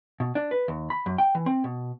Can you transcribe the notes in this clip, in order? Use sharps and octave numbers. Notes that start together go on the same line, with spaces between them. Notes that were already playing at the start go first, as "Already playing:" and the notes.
B2
D4
B4
D#2
B5
F#2
G5
E3
C4
B2